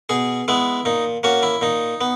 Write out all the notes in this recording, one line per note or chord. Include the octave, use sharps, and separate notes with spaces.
B2 G#4
G#3 B3 E4
A#2 D#4
A#3 C#4 F#4
E4
A#2 D#4
B3